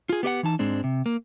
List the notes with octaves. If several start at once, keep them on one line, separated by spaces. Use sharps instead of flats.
F4 G#4
B3 G4 D5 F#5
E3 D#4 A5
G#2 G#3 C4 D4
C3
A#3